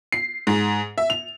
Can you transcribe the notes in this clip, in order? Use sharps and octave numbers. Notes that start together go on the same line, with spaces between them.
C7
G#2
E5
F7